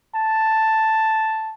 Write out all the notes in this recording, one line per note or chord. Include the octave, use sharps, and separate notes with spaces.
A5